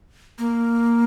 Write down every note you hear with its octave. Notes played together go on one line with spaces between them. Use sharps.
A#3